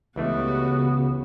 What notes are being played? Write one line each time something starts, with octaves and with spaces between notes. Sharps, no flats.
C#2 C#3 E3 A3 B3 F#4 G4